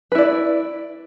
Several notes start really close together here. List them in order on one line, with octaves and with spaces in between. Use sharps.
B4 E4 D5